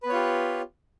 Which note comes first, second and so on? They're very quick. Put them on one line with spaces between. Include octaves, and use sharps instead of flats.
B4 B3 C#5 F4 G4